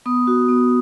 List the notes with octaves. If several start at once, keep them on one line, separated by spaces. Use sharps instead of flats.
B3 D#6
F#4
B3